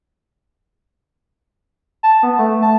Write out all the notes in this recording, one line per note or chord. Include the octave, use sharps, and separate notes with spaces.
A5
B3
A3
A5